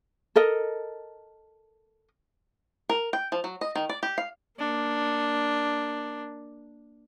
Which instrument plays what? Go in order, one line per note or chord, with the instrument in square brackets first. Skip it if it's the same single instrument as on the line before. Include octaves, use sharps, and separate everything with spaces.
[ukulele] A4 A#4 D#5
[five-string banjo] A#4
G5
F3
F#3
D#5
D#3
D5
G4
F5
[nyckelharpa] A#3 D4